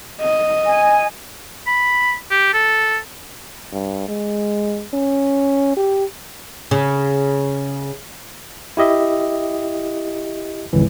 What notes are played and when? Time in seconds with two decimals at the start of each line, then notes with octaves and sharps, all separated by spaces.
0.21 D#5
0.66 G#5
1.67 B5
2.31 G4
2.54 A4
3.73 G2
4.08 G#3
4.94 C#4
5.77 G4
6.71 C#3
8.77 E4 G4 D#5 E5
10.73 G#1 C#2 E3